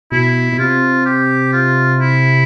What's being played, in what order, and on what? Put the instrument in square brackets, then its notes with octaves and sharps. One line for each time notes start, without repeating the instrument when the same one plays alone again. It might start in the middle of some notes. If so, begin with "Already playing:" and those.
[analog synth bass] B2 [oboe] E4
[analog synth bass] B2
[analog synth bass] C3 [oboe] F4
[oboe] G4
F4
E4